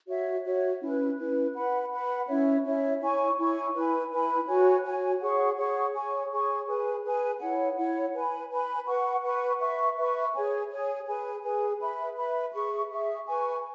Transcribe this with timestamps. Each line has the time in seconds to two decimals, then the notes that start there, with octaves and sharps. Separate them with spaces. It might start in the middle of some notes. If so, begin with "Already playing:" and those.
0.07 F#4 C#5 E5
0.44 F#4 C#5 E5
0.82 C#4 E4 B4
1.17 C#4 E4 B4
1.55 B4 F#5 B5
1.91 B4 F#5 B5
2.27 C#4 E4 C#5 E5
2.64 C#4 E4 C#5 E5
3.01 E4 C#5 G#5 C#6
3.38 E4 C#5 G#5 C#6
3.74 E4 B4 G#5 B5
4.10 E4 B4 G#5 B5
4.47 F#4 C#5 G#5
4.84 F#4 C#5 G#5
5.21 G#4 C#5 F#5 C#6
5.57 G#4 C#5 F#5 C#6
5.94 G#4 C#5 G#5 C#6
6.31 G#4 C#5 G#5 C#6
6.67 G#4 B4 G#5
7.04 G#4 B4 G#5
7.40 E4 C#5 F#5
7.76 E4 C#5 F#5
8.14 B4 G#5 B5
8.50 B4 G#5 B5
8.87 B4 F#5 C#6
9.23 B4 F#5 C#6
9.59 B4 E5 C#6
9.97 B4 E5 C#6
10.33 G#4 C#5 G#5
10.69 G#4 C#5 G#5
11.07 G#4 B4 G#5
11.43 G#4 B4 G#5
11.80 B4 E5 B5
12.16 B4 E5 B5
12.53 G#4 E5 C#6
12.89 G#4 E5 C#6
13.26 B4 G#5 C#6